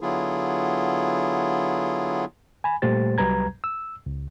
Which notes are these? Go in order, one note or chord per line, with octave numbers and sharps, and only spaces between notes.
D3 F#3 B3 E4 F4 G#4
G#5 B5
A#2 G3 A3 G4 C5 A6
C2 F#3 G3 B4 A#5 G#6
E6
C#2